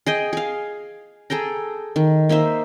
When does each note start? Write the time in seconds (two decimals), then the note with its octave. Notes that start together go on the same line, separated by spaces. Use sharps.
0.07 G#4 D#5 G5
0.33 G#4 F5
1.30 G#4 A4 G5 A#5
1.96 D#3
2.29 A#3 D#4 C5 E5